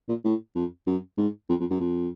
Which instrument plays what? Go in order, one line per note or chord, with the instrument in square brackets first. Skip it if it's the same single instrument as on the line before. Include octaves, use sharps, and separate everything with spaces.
[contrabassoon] A#2
A2
F2
F#2
G#2
F2
F2
F#2
F2